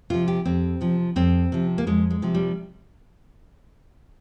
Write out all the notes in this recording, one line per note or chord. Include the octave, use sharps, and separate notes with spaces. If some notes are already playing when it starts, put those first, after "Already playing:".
C3 F3 F4
G4
F2 C4
C3 F3
F2 C4
C3 F3
A#3
F2 G#3
G#3
C3 F3
G3